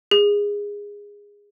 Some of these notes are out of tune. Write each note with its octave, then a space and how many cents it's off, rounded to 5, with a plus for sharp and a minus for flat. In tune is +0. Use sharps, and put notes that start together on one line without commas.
G#4 -20